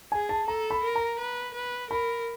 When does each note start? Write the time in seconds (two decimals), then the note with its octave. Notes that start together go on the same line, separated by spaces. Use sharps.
0.12 G#4 G#5
0.29 A5
0.47 A4 A#5
0.71 B5
0.83 A#4
0.96 A#5
1.19 B4
1.54 B4
1.90 A#4 B5